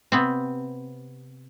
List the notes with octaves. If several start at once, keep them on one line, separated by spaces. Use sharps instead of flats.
C3 B3 C4